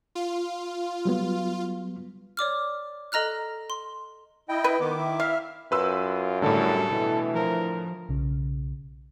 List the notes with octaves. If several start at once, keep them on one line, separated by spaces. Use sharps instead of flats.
F4
F#3 G3 B3
C#5 D5 D6 F6
A4 D#5 A#5 F6 F#6
C6
E4 D#5 G5
B4
D#3 B3 D6
E4
E5 F5 F6
F#2 F4 B4 C6 E6
A2 D3 G3 A4
B2 E3
F3 A#4
B1 C#3